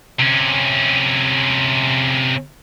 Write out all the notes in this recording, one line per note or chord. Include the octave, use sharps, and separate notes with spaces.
C3 C#4